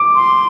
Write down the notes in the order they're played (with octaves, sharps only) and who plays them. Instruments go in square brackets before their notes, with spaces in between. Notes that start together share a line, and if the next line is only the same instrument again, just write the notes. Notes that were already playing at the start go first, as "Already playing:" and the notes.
Already playing: [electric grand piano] D6
[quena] C6